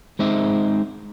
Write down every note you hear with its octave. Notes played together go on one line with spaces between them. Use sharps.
G#3 C4 D#4 C5 E5